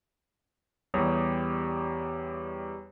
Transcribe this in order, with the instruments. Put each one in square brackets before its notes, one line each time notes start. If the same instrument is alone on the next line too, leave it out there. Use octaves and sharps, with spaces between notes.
[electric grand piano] E2 G3 G4 C#5 D#6